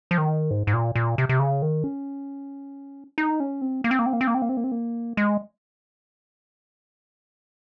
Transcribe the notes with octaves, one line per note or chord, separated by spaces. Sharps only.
F3
D#3
G#2
G#2
A#2
A#2
C3
C3
C#3
D#3
C#4
D#4
C#4
C4
A#3
C4
A#3
C4
A#3
C4
A#3
C4
A#3
C4
A#3
C4
A#3
G#3